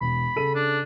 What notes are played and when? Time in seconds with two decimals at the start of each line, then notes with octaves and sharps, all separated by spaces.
0.01 E1 B5
0.36 C#3 A4 D#7
0.55 D4